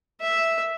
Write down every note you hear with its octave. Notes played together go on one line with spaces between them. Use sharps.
E5